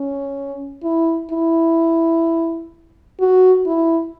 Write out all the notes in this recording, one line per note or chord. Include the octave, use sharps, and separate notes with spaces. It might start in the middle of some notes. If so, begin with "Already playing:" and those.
Already playing: C#4
E4
E4
F#4
E4